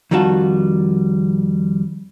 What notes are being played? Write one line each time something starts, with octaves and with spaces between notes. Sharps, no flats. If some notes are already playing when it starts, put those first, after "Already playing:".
F2 D#3 G3 F4 F#4 A5